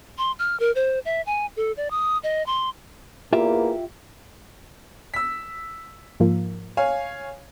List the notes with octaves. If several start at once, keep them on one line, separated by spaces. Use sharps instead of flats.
C6
F6
A#4
C5
E5
G#5
A4
D5
D#6
D#5
C6
E2 A#3 F4 G4 E5
E6 B6
G#2 F3 A#3
C#5 F5 G#5